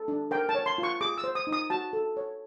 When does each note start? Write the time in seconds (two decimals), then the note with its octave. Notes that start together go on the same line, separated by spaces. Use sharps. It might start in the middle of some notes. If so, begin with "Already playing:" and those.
Already playing: A4
0.08 D4
0.31 A#4 G5
0.49 A5
0.55 C#5
0.66 C6
0.78 F4
0.83 C#6
1.01 G#4 D6
1.18 E6
1.24 C5
1.35 D#6
1.47 D#4
1.53 D#6
1.70 F#4 A5
1.93 A4
2.17 C#5